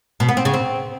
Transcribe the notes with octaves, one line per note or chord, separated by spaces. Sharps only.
B2
B3
C4
C#3
C4